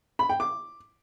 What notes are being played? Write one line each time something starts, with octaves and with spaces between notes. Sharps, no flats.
B5
G5
D6